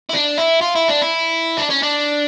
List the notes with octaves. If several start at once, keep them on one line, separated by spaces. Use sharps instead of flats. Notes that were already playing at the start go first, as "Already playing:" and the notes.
E4
D4
E4
F4
E4
D4
E4
D4
C#4
D4